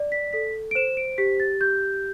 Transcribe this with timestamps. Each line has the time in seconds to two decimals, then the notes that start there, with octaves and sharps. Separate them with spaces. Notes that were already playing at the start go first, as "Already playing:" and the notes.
Already playing: D5
0.12 B6
0.33 A4 B6
0.71 D7
0.75 C5 E7
0.97 D7
1.18 G4 B6
1.40 A6
1.61 G4 G6